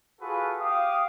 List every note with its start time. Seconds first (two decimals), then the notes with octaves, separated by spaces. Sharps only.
0.20 F4 F#4 G#4 A4 B4
0.59 G4 F5 D#6